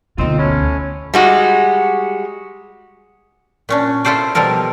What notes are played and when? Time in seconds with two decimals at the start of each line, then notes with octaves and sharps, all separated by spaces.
0.18 D2 B2 C4 D#4 F4
0.38 A2 C#4
1.14 G3 G#3 F#4
3.69 A#2 C#4 D4
4.05 E4 F4 A4 C5 D5
4.35 B2 F3 G3 A4 A#4